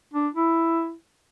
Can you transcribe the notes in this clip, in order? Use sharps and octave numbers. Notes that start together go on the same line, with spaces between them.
D4
E4